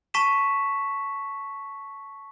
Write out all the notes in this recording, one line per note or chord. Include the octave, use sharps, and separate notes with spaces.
A5 C#6 B6 E7